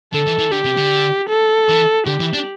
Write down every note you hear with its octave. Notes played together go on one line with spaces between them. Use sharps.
D3 A4
E3
E3
D3 G4
C3
D3
A4
E3
D3 G4
E3
D4